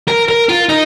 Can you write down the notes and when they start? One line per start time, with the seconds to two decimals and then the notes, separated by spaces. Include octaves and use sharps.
0.08 A#4
0.29 A#4
0.49 F4
0.69 D#4